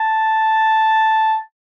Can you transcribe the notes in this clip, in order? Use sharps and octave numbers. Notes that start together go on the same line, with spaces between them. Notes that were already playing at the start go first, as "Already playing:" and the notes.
Already playing: A5